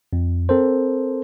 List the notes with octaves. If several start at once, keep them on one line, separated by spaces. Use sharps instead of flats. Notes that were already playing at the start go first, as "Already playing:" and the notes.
F2
C4 A4 A#4 C5